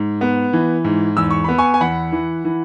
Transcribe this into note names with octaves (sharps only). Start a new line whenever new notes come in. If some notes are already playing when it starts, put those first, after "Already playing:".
Already playing: G#2
B3
E3
G#2
E2 E6
C#6
B3 B5
G#5 C#6
G#5
E2 F#5 B5
E3
E3